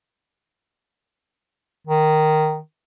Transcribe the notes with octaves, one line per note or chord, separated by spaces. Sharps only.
D#3